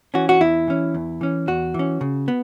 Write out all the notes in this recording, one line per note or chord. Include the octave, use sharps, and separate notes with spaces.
E3 C#4 F#4
F#4
E2 E4
E3 C#4
E2
E3 C#4
E2 F#4
E3 C#4
C#3
B3